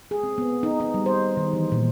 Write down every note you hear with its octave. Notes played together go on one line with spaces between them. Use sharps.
G#4
C4
B3
D#4
D#4
G3
C5
D#3
E3
A#2